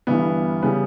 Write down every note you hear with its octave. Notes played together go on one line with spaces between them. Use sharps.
G1 G2 E3 B3
C#3 G3 B3